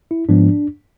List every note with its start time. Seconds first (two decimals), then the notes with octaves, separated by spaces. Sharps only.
0.11 E4
0.29 G#2 F3 G#3 B3 D4